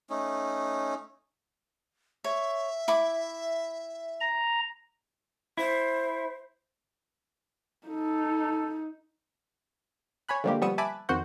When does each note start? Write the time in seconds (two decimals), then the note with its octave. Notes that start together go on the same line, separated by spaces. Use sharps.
0.10 A3 C#4 D#4
2.24 C#5 E5
2.88 E4 B5 D6
4.21 A#5
5.57 E4 C5
7.88 D#4 A4
10.29 C#5 G#5 B5 F#6
10.44 D3 F3 G3 G#3 A#3 G4
10.62 F3 G3 B3 C#6 D#6 E6
10.78 E5 G#5 A5 B5 D6 F#6
11.09 F2 D#3 F#4 C5 F#5 G6